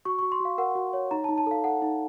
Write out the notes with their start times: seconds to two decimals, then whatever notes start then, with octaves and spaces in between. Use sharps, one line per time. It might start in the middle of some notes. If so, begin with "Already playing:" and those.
0.05 F#4 C#6
0.19 C#6
0.22 F#4
0.32 C6
0.40 F#4 F5
0.58 A#4 F#5
0.75 F#4
0.93 C#5
1.11 D#4 A#5
1.24 A5
1.29 D#4
1.38 A5
1.46 A4 F5
1.64 A4 F#5
1.82 D#4